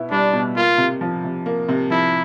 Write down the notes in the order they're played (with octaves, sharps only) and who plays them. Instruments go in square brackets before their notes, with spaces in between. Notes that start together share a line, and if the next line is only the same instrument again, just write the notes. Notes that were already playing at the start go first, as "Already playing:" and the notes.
Already playing: [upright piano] B2 B3 E4
[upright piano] G3 [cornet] D4
[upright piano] B2
[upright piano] A#3 [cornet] F4
[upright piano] C3
F3
C3
A#3
C3
[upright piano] F3 [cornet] E4